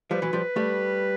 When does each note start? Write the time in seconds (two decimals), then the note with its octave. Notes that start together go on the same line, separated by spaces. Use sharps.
0.11 F3 G3 B4
0.22 E3 F#3
0.33 F3 G3
0.56 G3 A3